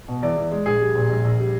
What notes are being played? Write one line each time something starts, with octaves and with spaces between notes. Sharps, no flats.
B2
E2 D5
E2
G#3
A#1 G#4
G3
A#2
A#1
A#1
G3